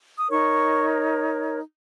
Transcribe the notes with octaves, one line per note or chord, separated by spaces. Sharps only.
D#6
D#4 A#4 C#5 C#6